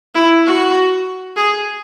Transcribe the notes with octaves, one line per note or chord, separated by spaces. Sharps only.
E4
F#4
G#4